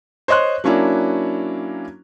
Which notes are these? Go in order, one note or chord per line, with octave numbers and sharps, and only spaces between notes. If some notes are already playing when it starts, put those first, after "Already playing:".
C5 C#5 D#5 C6 F#6
F#3 A#3 C#4 D4 E4